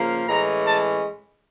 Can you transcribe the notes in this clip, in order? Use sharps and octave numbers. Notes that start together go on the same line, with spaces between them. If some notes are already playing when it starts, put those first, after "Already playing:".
Already playing: C#3 F3 A#3
A2 E3 G#3 C#4 A#5
A5